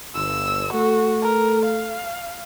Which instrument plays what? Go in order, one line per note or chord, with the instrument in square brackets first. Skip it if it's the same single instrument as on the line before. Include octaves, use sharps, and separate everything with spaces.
[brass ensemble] G1 [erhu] E6
[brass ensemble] A3 A4 [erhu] F#4
[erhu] A#4
F5